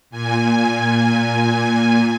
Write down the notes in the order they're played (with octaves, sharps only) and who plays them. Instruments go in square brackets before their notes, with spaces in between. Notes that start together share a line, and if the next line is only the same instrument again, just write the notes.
[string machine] A#2 G#5